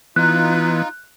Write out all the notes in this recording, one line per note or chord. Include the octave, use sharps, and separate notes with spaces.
E3 B3 D#4 F4 F#6